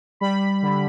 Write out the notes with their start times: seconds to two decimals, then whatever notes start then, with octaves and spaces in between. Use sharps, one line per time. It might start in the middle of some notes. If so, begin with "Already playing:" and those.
0.20 G3 B5
0.63 D3